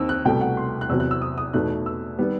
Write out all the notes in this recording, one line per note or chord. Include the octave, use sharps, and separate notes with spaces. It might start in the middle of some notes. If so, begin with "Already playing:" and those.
Already playing: D#2 D#3 C4 D#4 E6
F#6
C2 B2 A3 G5
F#5
C6
F#6
E2 C3 F#3 E6
F#6
E6
D#6
D#6
E2 B2 A3 D#4 F#6
E6
D#3 G3 B3